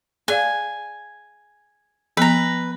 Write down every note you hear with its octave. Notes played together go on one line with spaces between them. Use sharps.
G#4 D5 F5 G#5
F3 B3 B4 A#5